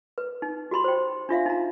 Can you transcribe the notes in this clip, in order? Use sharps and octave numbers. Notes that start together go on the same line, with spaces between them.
B4
D#4
F#4 G4 B5 C6
C5 G5
D4 F4 E5 F5
D#4 A#5